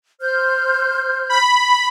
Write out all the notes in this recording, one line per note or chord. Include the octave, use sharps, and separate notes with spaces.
C5 F6 G6
B5